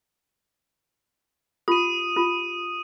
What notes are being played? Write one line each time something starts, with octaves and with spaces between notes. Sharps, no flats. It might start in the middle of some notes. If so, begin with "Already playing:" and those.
F4 G4 D#6 D#7
F4 G4